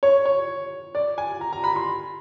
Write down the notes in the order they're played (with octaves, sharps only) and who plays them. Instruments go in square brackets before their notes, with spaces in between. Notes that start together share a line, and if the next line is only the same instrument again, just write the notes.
[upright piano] C#5
C#5
D5
G#5
A#5
A#5
B5
C6